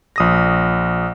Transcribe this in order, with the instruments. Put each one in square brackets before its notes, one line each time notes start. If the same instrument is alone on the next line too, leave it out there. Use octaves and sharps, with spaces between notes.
[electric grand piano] A#1 D#6 A#6